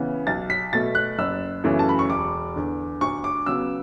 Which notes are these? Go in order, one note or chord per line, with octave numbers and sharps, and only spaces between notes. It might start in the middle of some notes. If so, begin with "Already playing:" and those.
Already playing: C#3 E3 B3
B1 A6
B6
B2 A3 A6
F#6
F#1 E6
F#2 C#3 E3 A3
A5
B5
C#6
E1 D6
E2 D3
D2 C#6
D6
C#3 F#3 B3 E6